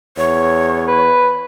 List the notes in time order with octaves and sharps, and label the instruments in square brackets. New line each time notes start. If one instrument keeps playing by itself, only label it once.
[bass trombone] E2 [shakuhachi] C#5
[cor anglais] B4